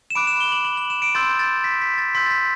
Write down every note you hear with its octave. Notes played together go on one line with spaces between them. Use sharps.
E7
B5 D6 F#6 D7
E7
G7
F#7
F#7
F#7
E7
D7
C6 E6 G6 A6
A6
B6
B6
A6
C6 E6 G6 B6
A6
B6